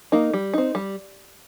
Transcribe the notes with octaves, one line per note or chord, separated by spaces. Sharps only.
A#3 D#4
G3
C4 D#4
G3